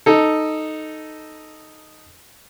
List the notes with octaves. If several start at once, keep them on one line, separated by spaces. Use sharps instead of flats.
D#4 A4